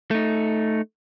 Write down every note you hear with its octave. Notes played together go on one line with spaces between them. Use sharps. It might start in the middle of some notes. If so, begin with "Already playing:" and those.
A3 D#4